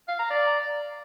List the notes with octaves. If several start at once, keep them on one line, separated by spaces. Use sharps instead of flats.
F5
A#5
D5